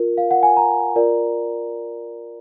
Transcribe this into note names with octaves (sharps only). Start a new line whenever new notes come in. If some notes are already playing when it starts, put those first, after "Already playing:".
Already playing: F4 A#4
F5
F#5
G#5
A#5
F4 A#4 D5